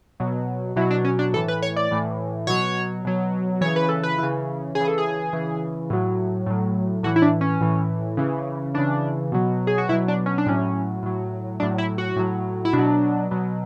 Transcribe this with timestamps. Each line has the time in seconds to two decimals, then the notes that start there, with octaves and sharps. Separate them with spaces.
0.20 B2 F#3
0.76 B2 F#3 E4
0.91 D4
1.05 C#4
1.19 D4
1.33 A2 E3 A4
1.48 B4
1.62 C#5
1.76 D5
1.91 A2 E3
2.47 B2 F#3 C#5
3.05 B2 F#3
3.61 C#3 E3 C#5
3.76 B4
3.89 A4
4.03 B4
4.18 C#3 E3
4.75 C#3 G#4
4.81 E3
4.88 A4
4.98 G#4
5.33 C#3 E3
5.90 A2 F#3
6.46 A2 F#3
7.03 A2 E3 F#4
7.16 E4
7.22 D4
7.41 C#4
7.61 A2 E3
8.17 C#3 E3
8.74 C#3 E3 D4
9.32 B2 F#3
9.67 G#4
9.78 F#4
9.89 B2 F#3 E4
10.08 D4
10.26 C#4
10.38 D4
10.46 A2 F#3 C#4
11.03 A2 F#3
11.60 A2 F#3 D4
11.78 E4
11.98 F#4
12.16 A2 F#3
12.65 E4
12.73 B2 D4
12.78 F#3
13.31 B2 F#3